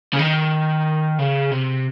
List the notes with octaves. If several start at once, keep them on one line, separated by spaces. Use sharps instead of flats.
C#3
D#3
C#3
C3